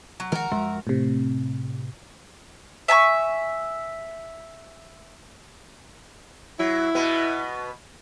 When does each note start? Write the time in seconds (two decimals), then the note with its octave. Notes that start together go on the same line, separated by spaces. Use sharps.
0.20 F#3
0.32 D#3 F3 G#3 F#4 A#4
0.52 F#2 F3 G#3
0.87 A2 C3
2.88 E5 G#5 A5 C#6
6.59 F#3 E4
6.95 B2 B3